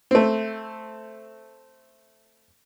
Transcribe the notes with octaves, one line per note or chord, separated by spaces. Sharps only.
A3 C4